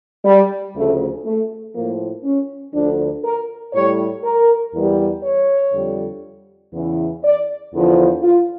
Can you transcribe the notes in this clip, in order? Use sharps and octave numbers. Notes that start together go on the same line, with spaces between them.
G3
D2 C#3 F3 A3
A3
A2 F3 A#3
C#4
D2 D3 F3 D4
A#4
A2 G3 C#5
A#4
E2 E3 G3
C#5
F2 D3 G3
E2 C#3 E3
D5
E2 D3 F3
F4